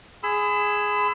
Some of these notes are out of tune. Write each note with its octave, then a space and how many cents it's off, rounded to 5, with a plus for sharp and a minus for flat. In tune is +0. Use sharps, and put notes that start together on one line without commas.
G#4 +0 B5 +40 E6 +0